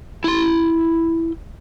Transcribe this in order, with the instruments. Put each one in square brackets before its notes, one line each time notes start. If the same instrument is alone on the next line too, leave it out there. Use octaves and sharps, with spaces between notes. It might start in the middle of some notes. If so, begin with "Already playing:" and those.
[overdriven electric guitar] E4 C6